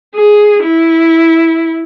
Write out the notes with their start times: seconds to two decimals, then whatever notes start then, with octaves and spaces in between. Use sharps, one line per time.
0.15 G#4
0.64 E4